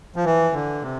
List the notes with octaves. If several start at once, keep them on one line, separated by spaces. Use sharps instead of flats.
F3
E3
D3
C3